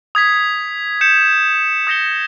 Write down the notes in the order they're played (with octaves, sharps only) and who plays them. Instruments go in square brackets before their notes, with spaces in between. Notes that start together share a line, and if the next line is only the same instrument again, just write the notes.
[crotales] D#6 G#6 B6
G6 C#7 E7
D#6 G6 A#6 C#7 G7